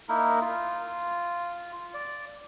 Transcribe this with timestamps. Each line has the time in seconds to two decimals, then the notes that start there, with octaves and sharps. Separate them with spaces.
0.09 A#3 D#4 E4 A#4
0.41 F4
1.94 D5